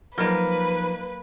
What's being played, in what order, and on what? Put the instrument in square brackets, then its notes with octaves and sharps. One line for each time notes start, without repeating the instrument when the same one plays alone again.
[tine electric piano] F3 D#4 [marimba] F#3 [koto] A#3 [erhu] B4